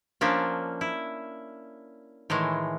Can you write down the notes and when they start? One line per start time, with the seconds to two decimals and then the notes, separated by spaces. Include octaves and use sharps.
0.21 F3 A#3 C#4 D4
0.81 E4
2.30 A2 D#3 E3 G#3